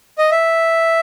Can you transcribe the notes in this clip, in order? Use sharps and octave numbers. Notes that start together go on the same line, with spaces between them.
D#5
E5